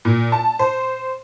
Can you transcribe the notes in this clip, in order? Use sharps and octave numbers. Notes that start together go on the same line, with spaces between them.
A#2
A5
C5